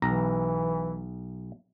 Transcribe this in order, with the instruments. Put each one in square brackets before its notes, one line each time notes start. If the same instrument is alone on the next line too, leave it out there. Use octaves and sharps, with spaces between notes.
[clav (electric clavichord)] B1 A#5 [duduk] E3